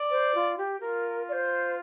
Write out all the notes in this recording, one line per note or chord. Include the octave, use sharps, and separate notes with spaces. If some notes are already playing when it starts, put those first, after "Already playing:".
Already playing: D5
C5
F4
G4
F4 A#4
D5
C5